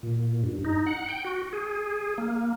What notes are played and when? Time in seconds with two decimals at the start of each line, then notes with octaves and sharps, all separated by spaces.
0.03 A#2
0.44 G2
0.65 D#4
0.86 F#5
1.09 G5
1.24 F#4
1.53 G#4
2.18 A#3